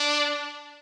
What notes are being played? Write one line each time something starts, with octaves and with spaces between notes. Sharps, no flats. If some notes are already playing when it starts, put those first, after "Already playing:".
Already playing: D4